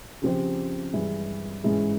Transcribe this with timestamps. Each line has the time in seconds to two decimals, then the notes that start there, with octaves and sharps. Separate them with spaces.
0.22 C#3 F3 C4 G4 C5
0.93 G2 E3 G#3 E4
1.64 G#2 E3 G#3 C#4 E4